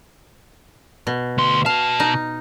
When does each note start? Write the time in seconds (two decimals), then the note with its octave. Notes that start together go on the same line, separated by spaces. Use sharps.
1.07 B2
1.38 D2 C6
1.66 B2 F5 A5
2.00 D#4